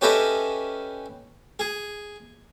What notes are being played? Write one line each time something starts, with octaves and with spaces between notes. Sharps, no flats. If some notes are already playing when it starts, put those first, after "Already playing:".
C#4 G4 A4 B4 D#5 E5
G#4